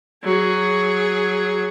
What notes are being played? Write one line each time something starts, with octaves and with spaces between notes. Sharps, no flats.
F#3 G#4